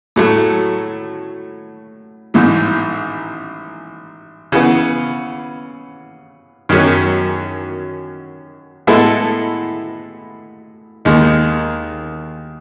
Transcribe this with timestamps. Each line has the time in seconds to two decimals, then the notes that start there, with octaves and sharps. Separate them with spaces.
0.16 A2 F#3 A3
2.34 A1 G#2 E3
4.52 C#3 E3 B3
6.69 F#2 D#3 F#3 C#4
8.87 A2 G#3 B3 E4 A4
11.05 D#2 D#3 G#3